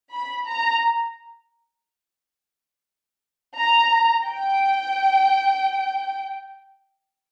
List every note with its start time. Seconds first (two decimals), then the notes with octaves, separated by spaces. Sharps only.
0.13 B5
0.48 A#5
3.58 A#5
4.26 G5